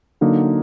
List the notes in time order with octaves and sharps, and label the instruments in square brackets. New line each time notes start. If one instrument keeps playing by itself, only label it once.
[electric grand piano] D3 F#3 A#3 D#4